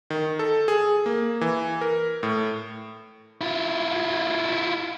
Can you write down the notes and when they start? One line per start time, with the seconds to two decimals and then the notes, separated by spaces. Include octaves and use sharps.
0.10 D#3
0.39 A4
0.68 G#4
1.06 A#3
1.41 E3
1.81 A#4
2.23 A2
3.41 E4 F4